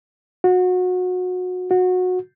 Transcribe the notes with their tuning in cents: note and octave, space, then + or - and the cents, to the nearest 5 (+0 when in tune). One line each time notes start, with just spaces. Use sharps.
F#4 -25
F#4 -20